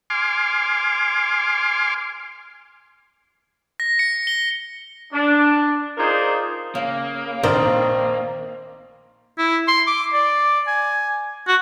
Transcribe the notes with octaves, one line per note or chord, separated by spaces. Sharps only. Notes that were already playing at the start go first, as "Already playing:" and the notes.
G#5 C6 D6 F6
A#6
C#7
G7
D4
D#4 F4 G#4 A#4 C5 D5
C#3 A#3
A#1 D#3 C4 A#4 D5
E4
C6
D6
D5
G#5
F#4